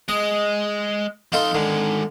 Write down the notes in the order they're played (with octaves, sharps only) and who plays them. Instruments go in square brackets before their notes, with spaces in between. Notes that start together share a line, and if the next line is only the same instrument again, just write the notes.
[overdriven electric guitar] G#3 [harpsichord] D#5
[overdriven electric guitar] F2 C6 [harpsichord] D#4 F4 A4
[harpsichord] D3 [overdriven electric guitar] D#3 G#3